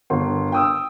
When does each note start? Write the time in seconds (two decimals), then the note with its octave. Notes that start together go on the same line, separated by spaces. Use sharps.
0.10 G1 A#4 C6
0.52 G5 D#6 E6